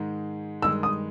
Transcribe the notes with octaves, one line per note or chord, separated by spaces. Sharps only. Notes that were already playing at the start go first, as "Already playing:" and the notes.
Already playing: G#2 D#3 G#3
G2 D#3 G#3 E6
D#6